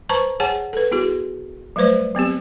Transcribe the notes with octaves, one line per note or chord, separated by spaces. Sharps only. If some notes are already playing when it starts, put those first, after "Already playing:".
B4 C5 A5 A#5 C#6
G#4 C#5 F#5 G#5 A5
A4 B4
B3 E4 F#4 G#4
F#3 G3 A3 B4 C5 D5
F#3 B3 C4 G4